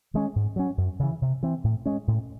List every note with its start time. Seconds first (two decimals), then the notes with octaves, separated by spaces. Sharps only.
0.14 D#3 G#3 C#4
0.36 G#2
0.56 F#3 C#4
0.77 F#2
0.99 C#3 E3
1.22 C3
1.43 E3 C4
1.64 A2
1.86 G#3 C#4
2.08 A2